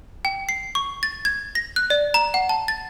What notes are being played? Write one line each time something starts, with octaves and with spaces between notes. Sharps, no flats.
G5
C7
C#6
A6
G#6
A#6
F#6
D5
A#5
F#5
A5
A6